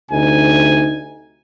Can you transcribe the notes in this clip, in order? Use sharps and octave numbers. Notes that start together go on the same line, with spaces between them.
D2 C3 D#4 G#5